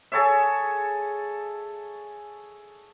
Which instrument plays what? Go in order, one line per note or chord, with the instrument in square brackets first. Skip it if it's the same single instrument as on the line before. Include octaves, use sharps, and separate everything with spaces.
[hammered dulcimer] G#4 A4 C#5 E5